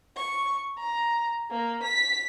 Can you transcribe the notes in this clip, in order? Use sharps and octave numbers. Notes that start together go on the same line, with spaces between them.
C#6
A#5
A#3
B6